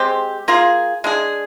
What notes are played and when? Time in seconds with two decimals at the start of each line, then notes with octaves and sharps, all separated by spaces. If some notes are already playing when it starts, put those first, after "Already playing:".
Already playing: G#3 C4 G4
0.48 A#3 F4 G#4
1.04 G#3 D4 G#4